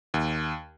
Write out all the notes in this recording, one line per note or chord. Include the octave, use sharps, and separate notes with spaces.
D#2